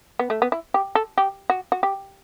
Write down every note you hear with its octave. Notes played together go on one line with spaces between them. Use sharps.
B3
A3
B3
E4
G4
A4
G4
F#4
F#4
G4